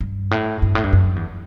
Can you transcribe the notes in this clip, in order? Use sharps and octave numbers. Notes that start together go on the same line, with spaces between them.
G2
A2
G2
A2
G2
F#2
E2